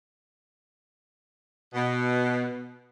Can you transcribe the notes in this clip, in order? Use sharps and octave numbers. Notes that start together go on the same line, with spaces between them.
B2